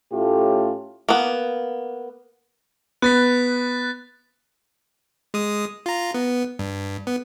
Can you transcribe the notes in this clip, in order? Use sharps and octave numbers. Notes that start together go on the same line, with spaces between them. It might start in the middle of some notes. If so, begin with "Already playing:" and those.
A2 A3 C#4 F4 G4
A#3 B3
B3 F#6 A6 B6
G#3 D#6
F4 A#5
B3
G2
B3